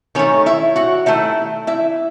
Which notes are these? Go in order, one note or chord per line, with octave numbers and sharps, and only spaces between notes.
D#3 A3 C#4 C#5
E4 E5
F#4 F#5
D#3 A3 E4 E5
E4 E5